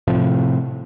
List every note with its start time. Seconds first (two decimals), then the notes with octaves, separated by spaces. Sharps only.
0.08 A2 C3 F3